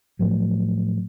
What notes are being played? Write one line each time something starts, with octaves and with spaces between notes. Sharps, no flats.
A2 F3 F#3